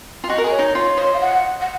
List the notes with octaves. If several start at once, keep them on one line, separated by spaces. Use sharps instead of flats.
F4
F#4 D#5
A#4
G#4
C#5
D#4
F4 C#5
C5 C#5 D#5
F5
F#5
F#5